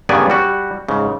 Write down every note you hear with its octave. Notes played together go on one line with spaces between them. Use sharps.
G2 C#3 A#3 B3 D5 G#5
G3 F#4
G#2 C#3